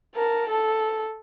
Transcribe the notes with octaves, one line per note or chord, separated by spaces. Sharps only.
A#4 A5
A4